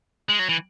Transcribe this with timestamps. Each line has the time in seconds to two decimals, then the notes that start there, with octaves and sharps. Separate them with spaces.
0.29 G#3
0.39 F#3
0.49 E3